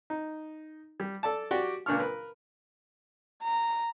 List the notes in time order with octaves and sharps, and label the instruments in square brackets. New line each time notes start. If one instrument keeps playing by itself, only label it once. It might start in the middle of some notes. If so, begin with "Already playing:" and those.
[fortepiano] D#4
G3
A4 D5 A5
F#4 G4 D5 G5
C#2 A#2 D4 C#6 F6
A#4 B4
[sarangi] A#5